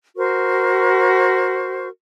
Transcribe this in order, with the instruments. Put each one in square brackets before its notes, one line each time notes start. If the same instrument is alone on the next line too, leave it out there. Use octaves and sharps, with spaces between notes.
[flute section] F#4 A#4 C5 C#6